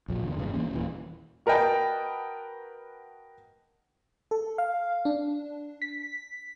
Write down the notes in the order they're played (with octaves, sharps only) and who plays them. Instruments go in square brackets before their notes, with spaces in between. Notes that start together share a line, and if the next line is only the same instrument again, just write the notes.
[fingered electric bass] A#1 F2 A#2
E2 D3
A1 G2 C#3
E3 A#3 C#4
D#1 D#2 E3
[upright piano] F#4 A#4 B4 D#5 G5 A5
[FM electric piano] A4
F5
D4
B6